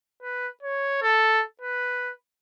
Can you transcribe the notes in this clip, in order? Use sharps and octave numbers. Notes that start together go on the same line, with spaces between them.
B4
C#5
A4
B4